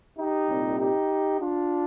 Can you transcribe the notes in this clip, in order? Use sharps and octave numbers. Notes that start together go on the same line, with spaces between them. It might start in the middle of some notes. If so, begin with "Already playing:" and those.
D#4 G4
C2 A#2 G3 C4
D#4 G4
D4 F4